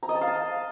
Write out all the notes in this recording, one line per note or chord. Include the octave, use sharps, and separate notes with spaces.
A#5
D#5
A5
F5
A5